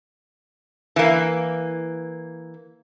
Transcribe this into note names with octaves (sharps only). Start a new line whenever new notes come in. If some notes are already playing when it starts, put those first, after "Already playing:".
E3 A#3